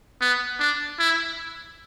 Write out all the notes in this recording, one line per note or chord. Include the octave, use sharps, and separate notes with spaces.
B3
D4
E4